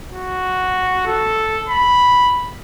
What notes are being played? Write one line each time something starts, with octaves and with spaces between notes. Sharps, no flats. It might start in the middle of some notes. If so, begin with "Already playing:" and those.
F#4
A4
B5